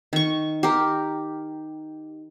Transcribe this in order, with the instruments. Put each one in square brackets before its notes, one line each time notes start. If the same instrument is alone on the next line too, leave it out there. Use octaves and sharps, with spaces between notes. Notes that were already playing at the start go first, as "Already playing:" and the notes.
[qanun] D#3 C#6
G4 A#4